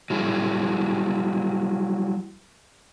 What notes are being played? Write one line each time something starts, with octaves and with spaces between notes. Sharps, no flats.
F#3 G3 E4 G4 G#4